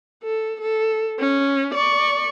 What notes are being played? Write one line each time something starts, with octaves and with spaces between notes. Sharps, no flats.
A4
A4
C#4
D5 C#6